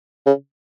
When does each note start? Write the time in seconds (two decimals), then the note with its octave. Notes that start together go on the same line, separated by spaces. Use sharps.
0.26 C#3